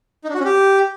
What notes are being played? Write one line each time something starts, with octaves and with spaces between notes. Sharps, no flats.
D#4
D4
F#4
C#4
G4